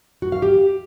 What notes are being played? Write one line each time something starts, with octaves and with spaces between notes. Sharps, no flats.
F#4
F5
G4